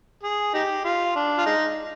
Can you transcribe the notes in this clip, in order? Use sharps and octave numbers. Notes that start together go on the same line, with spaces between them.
G#4
D#4 G4
F4
D4
F4
G#3 D#4